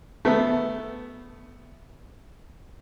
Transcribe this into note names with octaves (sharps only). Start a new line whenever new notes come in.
A3 B3 E5